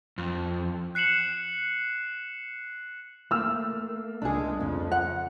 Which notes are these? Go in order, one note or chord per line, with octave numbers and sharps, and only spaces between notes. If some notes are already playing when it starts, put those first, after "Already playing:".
F2
F#6 C7 C#7 E7 F#7
A3 A#3 E6 F6
C#2 G#3 D4 G#4
F2 C#3
F#5